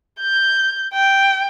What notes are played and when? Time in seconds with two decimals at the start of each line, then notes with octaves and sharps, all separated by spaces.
0.21 G6
0.93 G5